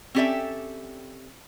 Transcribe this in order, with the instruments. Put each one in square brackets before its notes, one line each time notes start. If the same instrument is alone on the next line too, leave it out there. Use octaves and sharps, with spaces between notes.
[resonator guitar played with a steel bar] C4 C#4 G4 A4 D5 E5